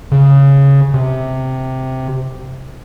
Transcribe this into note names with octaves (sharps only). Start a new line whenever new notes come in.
C#3
C3